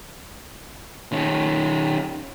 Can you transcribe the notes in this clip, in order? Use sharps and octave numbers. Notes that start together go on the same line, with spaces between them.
D#3 C#4